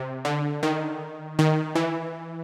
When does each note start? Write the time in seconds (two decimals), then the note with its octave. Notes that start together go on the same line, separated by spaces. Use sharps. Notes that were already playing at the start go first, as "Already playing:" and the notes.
Already playing: C3
0.25 D3
0.63 D#3
1.39 D#3
1.75 E3